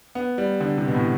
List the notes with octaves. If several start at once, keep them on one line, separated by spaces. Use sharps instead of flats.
B3
G3
D3
C3
B2
A2